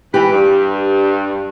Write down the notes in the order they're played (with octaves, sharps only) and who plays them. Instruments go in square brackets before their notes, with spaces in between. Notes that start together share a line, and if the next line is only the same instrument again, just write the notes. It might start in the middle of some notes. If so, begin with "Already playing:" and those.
[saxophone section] E3 B4 [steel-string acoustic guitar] G4
[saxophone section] G2